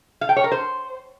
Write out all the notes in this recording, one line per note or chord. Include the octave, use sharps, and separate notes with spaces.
F5
G5
C#5
A#4
C5